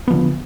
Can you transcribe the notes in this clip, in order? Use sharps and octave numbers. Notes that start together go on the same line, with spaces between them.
D3 F3 B3